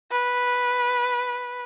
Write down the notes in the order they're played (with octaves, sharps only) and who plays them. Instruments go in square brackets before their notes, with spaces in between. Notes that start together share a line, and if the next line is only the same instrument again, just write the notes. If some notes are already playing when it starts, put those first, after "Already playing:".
[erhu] B4